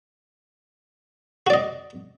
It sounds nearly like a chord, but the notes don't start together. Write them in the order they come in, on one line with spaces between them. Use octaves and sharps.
F#4 D5 D#5